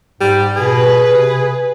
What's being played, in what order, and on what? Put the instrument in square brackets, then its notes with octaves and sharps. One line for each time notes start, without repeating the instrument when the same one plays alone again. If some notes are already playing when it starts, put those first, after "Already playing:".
[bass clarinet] G#2 [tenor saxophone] G3
[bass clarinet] B2 [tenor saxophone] G#4 [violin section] B4
[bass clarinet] C3